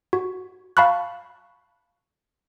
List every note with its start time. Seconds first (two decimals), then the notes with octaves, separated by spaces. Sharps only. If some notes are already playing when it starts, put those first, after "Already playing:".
0.13 F#4
0.77 F5 A5 B5 C#6 F#6